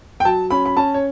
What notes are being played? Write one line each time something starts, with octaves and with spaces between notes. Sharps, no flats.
G5
F#3 A5
C#4 B5
B5
C#4 A5
C#5